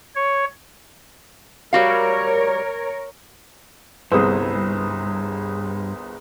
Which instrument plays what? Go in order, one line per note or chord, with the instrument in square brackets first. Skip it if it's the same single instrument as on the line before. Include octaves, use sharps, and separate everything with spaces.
[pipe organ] C#5
[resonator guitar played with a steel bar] G3 F#4 F5 [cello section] A#4 C#5
[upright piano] G1 C2 C5 [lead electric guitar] G2 [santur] G#4 B4 E6